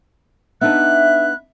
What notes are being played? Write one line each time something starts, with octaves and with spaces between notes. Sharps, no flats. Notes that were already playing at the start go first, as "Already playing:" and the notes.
B3 D4 D#4 E5 F#6